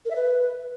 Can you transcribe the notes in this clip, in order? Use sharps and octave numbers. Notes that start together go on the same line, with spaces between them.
A#4
E5
B4